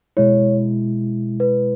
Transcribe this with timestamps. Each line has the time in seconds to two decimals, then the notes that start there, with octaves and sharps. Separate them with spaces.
0.17 B2 G#3 E4 C#5
1.40 B4